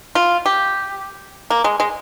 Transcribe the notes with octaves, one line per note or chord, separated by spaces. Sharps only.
F4
G4
A#3
G#3
G#3